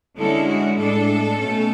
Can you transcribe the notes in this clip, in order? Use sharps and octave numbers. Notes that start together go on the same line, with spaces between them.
D3 G#3 C#4 E4 A4
F#4
A2 G#3 D4 A4
B2 A3 C#4